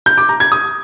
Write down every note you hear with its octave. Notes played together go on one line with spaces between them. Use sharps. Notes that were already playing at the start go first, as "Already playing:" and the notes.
G6
D6
A#5
G#6
D#6